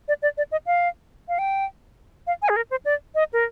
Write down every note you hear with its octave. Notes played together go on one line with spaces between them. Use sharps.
D5
D5
D5
D#5
F5
F5
G5
F5
G#5
G#4
A#4
C5
D5
D#5
A#4